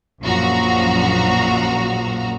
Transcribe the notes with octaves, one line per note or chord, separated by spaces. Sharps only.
A#1 F#2 A#2 F3 F#4 A#5